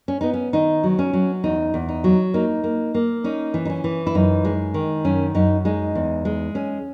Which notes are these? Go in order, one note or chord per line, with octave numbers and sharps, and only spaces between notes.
C#4
B3 D#4
C#4
D#3 D#4
F#3
C#4
F#3
E2 D#4
E2
D#4
F#3
A#3 D#4
A#3
A#3
C#4 D#4
E3
D#4
C#4
E3
E4
F#2 D#4
G#3
D#3
F#2 C#4
F#2 D#4
G#3 D#4
E2
G#3
C#4